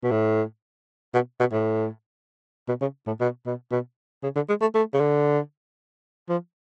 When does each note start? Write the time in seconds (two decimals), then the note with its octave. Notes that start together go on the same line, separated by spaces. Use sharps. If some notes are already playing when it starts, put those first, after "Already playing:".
0.03 B2
0.11 A2
1.14 B2
1.40 B2
1.52 A2
2.68 B2
2.81 C#3
3.07 A2
3.20 B2
3.46 B2
3.71 B2
4.23 C#3
4.35 D3
4.49 G#3
4.61 A3
4.74 A3
4.94 C#3
5.00 D3
6.29 F3